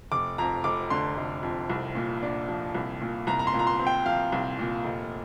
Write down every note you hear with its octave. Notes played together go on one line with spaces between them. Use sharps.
F1 D6
F2 A#5
F1 D6
D3 C6
F1
F2
C2
A#2
D4
F3
C2
A#2
C2 A#5
A#5
C6
A#2
A#5
C6
C4
G5
F3 F5
C2
A#2
F1